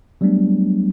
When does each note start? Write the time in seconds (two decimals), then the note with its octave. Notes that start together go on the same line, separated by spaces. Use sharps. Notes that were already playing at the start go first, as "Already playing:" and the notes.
0.21 F#3 G3 A3 B3 D4